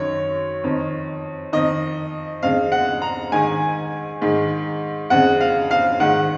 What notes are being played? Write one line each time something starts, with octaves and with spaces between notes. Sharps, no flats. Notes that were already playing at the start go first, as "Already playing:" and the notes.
Already playing: F#2 D#3 C#5
F2 D#3
F2 D#3 D#5
F2 C#3 F5
F#5
A#5
G#2 D#3 G#5
G#2 D#3
F2 C#3 F#5
F5
F5
G#2 D#3 F#5